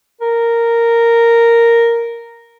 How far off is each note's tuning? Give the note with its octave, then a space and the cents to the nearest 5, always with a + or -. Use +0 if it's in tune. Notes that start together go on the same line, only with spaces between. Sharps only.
A#4 -5